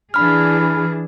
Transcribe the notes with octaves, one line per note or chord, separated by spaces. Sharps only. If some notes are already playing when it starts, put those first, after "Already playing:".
E3 D4 G#4 B5 F6